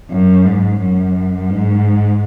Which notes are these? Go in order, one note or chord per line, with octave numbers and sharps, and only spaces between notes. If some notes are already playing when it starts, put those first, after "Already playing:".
F#2
G#2
F#2
G#2